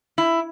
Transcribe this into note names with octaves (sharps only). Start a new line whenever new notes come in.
E4